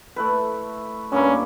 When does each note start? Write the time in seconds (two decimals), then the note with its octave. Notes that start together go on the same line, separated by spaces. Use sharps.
0.16 A3 E4 B4
1.12 G2 A#3 C#4 E4